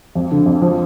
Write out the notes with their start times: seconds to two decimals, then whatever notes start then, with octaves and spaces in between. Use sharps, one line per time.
0.15 F2
0.31 D3
0.46 F2
0.62 F3